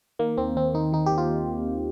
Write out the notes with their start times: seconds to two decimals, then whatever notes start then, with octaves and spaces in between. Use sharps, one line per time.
0.19 D#3 A#3
0.37 D#2 C4
0.56 D#2 C4
0.74 D#3 D#4
0.92 D#3 D#4
1.06 G4
1.12 D#2
1.18 F4